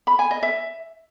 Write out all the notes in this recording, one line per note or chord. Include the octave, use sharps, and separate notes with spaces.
B5
G#5
D#5
E5